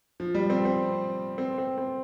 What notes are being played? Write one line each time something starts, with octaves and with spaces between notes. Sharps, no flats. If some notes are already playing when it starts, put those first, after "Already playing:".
F3
G3
C4
C4
C4
C4
C4